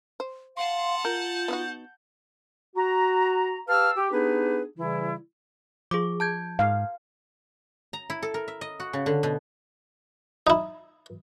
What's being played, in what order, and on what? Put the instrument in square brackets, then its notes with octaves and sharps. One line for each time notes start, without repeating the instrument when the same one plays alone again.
[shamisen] C5
[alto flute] F5 [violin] F#5 A5 [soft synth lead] C6
[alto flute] F4 [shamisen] A#4 [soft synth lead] G6
[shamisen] B3 D#4 F#4
[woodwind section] F#4 A#5
G4 B4 F5 A5 E6 F6
G4
B3 D4 D#4 G4 G#4 B4
C#3 E3 G3 E4
[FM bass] F3 [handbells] G#4 D6
[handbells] A5 G6 G#6
[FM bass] G#2 [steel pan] F5
[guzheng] A#5
E4
A4
A#4
E5
D#5
F#4
C#3
D3
B2
[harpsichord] D#4 E4